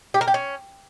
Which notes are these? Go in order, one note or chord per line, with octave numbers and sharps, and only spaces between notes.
G4
A#4
G4
C#4